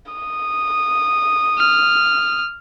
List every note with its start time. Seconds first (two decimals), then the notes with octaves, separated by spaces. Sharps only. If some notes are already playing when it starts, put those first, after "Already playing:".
0.12 D#6
1.58 F6